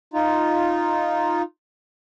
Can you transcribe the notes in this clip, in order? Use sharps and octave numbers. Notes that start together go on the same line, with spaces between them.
D#4 F4